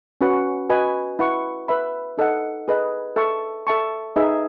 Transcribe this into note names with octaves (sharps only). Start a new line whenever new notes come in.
C#4 F#4 B4 F#5
F#4 B4 D#5 G#5 B5
E4 B4 F#5 C#6
B4 E5 B5
D#4 A4 D#5 F#5
G#4 B4 D#5
A4 E5 A5 C#6
A4 E5 A5 C#6
D#4 G#4 B4 E5